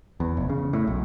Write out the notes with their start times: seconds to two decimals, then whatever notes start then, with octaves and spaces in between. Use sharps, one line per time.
0.20 E2
0.37 F1
0.50 C#3
0.73 A2
0.87 B1